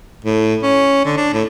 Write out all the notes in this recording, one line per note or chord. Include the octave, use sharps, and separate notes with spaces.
A2
C#4
D3
D4
A2